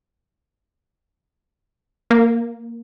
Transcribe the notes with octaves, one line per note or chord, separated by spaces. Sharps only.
A#3